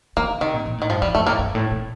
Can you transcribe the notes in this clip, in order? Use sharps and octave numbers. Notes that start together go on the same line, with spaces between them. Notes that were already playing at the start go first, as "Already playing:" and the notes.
D3 A#3
C3 D#3
A#2
A#2
A2 D#3
G2 F3
F2 G3
G2 A3
A2 A#3
G2
A2
A#2